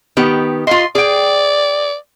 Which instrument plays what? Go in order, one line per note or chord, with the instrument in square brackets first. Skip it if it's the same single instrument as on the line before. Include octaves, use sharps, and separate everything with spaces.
[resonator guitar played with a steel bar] D#3 B3 G4
[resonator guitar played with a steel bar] F4 D#5 [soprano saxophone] C6
[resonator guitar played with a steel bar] G#4 G5 [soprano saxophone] D5